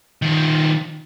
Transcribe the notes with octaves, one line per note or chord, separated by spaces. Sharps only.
D#3 F3